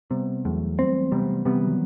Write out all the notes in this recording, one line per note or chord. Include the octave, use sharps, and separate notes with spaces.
C3 G3 B3
E2 F#3 A3
E3 G3 C4
C3 G3 B3
C3 G3 B3
E3
D#3 F#3